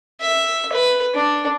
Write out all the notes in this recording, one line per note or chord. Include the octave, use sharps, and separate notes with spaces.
E5
B4
D4